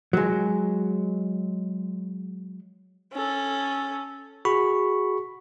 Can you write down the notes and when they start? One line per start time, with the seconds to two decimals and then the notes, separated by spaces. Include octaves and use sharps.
0.13 F#3 G#3
3.13 C#4 A4
4.45 F#4 G#4 B5 C#6